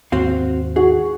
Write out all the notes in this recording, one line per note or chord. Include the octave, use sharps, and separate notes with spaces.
D#2 G#2 C4 F#4 F5
F#4 G#4